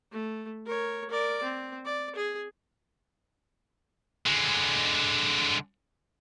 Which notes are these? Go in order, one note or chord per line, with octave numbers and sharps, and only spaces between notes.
A3
A#4 C#5
A#4 D5
C4
D5
G#4
D3 G#3